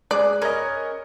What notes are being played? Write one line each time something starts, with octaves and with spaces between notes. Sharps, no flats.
G#3 G#4 D5 F#6
C#4 A#4 C#5 D#5 B5